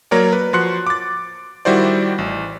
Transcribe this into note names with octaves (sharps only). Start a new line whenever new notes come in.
F#3 A#3 A#4 C#5 D5
B4
F3 F#4 C6 F#6 C#7
D6 A6
D#3 G3 E4 F#4 C5 D5
A1